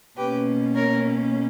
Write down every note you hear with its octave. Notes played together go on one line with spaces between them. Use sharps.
B2 A#3 C#4 G4 B4
A#4 C#5